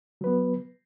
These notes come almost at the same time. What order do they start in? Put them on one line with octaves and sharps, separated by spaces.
F#3 B4 B3